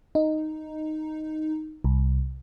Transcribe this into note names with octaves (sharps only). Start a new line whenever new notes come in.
D#4
C2